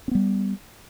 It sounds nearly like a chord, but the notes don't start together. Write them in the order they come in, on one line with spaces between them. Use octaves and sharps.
C4 B3 G3